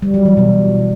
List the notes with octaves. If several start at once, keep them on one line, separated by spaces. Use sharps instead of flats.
G3
F#3
E3
B2